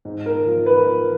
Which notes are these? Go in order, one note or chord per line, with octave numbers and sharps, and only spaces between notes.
G#2
A#4
F3
B4
F3